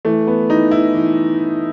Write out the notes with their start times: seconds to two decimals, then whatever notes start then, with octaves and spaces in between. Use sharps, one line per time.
0.05 E3 A3
0.27 B3
0.50 E3 D#4
0.71 E4
0.94 E3